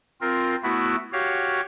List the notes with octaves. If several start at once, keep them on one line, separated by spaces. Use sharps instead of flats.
C4 F4 A#4
A3 B3 E4 F#4
F#4 G4 C#5 F5